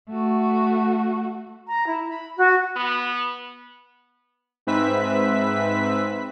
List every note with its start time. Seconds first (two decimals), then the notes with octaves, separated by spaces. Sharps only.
0.11 A3 F#4
1.67 A#5
1.87 E4
2.08 B5
2.37 F#4
2.76 B3
4.67 G#2 C4 B4 E5 B6